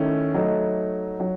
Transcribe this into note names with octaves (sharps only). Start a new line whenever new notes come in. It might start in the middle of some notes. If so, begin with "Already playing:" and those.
Already playing: D#3 A3 C#4 E4
F#3 A3 D#4
F#3